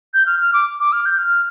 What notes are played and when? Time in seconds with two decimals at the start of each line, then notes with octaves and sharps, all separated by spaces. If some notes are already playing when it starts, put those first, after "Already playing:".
0.14 G6
0.26 F6
0.39 F6
0.53 D6
0.79 D6
0.92 F6
1.05 G6
1.18 F6